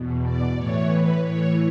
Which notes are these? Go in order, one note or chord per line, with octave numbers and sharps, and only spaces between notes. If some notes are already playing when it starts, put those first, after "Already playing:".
Already playing: E2 B2
D5
A2 E3 C#5
B4
A2 E3 C#5